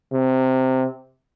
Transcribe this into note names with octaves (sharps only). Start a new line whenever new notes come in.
C3